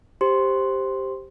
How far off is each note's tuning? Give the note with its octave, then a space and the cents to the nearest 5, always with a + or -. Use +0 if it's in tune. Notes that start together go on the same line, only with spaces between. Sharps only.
G4 +0 C5 +5 C6 +0